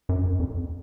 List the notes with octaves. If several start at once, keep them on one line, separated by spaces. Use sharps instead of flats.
F#2
F2